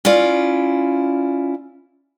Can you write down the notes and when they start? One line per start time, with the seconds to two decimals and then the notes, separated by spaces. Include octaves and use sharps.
0.05 C#4 E4 F4 D5